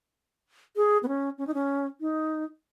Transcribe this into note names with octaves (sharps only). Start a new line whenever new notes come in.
G#4
B3
C#4
C#4
D#4
C#4
D#4